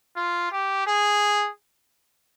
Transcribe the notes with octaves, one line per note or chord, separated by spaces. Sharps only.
F4
G4
G#4